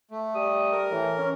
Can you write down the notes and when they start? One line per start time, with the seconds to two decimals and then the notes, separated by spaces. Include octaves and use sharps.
0.11 A3
0.35 G3 D#6
0.72 A#4
0.92 A2 E3
1.18 C#4